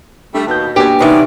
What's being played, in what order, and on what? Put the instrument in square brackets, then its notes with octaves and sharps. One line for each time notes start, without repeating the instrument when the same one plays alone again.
[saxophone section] G3 A3 [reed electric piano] D4
[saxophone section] D#2 B2 [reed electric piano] A5 G6
[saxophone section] B2 [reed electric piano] A#3 D4 B4 [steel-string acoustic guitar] G4 G#5
[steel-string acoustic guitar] C3 E3 [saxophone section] B3 C#4 D5 [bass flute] D#4